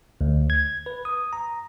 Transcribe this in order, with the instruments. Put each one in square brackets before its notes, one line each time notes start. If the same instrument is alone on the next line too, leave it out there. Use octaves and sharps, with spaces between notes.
[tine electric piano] D2
G#6
B4
D#6
A#5